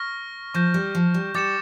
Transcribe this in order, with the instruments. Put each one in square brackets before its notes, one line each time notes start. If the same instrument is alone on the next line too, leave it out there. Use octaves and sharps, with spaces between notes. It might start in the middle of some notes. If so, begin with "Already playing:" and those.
Already playing: [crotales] C#6 F6 A#6
[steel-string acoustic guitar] F3 [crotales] C#6 G6 A#6 E7
[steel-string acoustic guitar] G3
F3
G3
[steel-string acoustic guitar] G3 [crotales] D6 A6 C#7 E7